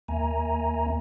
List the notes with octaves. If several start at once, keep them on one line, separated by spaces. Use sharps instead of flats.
D#2 A#3 E5 G#5 A#5